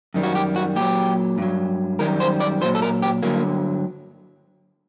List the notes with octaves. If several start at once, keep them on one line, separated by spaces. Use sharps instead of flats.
F#2 D#3 G3
F#4
G4
F#4
A#2 F#3 G4
G2 F#3
F#2 D#3 G3 A#4
C5
D5
A#2 F#3 C5
A4
A#4
G4
G2 D3 F#3 A#3